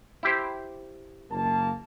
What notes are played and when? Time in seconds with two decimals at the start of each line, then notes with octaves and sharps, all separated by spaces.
0.23 E4 G4 C5
1.31 F#1 A#3 A5